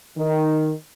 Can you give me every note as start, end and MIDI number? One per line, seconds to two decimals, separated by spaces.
0.17 0.71 51